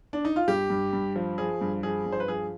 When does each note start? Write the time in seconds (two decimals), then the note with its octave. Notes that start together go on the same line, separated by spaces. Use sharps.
0.13 D4
0.25 D#4
0.36 F4
0.48 G2 G4
0.70 G2
0.93 G2
1.16 F3
1.38 F3 G#4
1.61 G2
1.83 F3 G#4
2.06 G2
2.12 C5
2.20 B4
2.28 F3 G#4